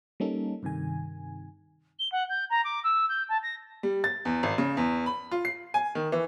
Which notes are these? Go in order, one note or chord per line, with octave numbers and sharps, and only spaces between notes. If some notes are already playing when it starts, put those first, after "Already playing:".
G3 A#3 C#4 D#4 A4
G2 C3 D#3 G#5
G7
F#5
G6
A#5
D6
E6
G6
A5
A#6
G3
A6
E2
G#1
C#3
E2
B5
F4
C7
G#5
D#3
E3